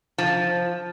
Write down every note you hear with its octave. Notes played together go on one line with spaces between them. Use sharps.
F3